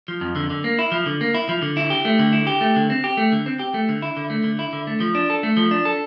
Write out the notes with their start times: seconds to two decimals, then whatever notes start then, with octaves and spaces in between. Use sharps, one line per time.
0.08 F3
0.21 F2
0.36 D3
0.50 D3
0.64 A#3
0.79 E4
0.92 F3
1.06 D3
1.21 A#3
1.34 E4
1.49 F3
1.62 D3
1.77 E4
1.90 G4
2.05 A3
2.19 D3
2.33 E4
2.47 G4
2.61 A3
2.76 D3
2.90 C4
3.04 G4
3.17 A3
3.32 D3
3.46 C4
3.59 G4
3.74 A3
3.89 D3
4.02 E4
4.17 D3
4.30 A3
4.44 D3
4.59 E4
4.73 D3
4.87 A3
5.00 F3
5.15 D4
5.30 A4
5.43 A3
5.57 F3
5.71 D4
5.85 A4